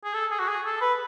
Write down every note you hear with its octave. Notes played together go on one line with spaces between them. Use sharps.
G#4
A4
G#4
F#4
G#4
A4
B4